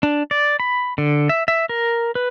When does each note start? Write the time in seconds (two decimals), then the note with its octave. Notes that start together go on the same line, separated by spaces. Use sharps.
0.03 D4
0.31 D5
0.60 B5
0.98 D3
1.29 E5
1.48 E5
1.69 A#4
2.15 B4